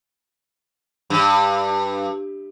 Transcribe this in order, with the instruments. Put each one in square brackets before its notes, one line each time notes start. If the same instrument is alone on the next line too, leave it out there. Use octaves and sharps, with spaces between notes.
[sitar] G2